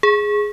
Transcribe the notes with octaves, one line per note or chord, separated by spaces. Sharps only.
G#4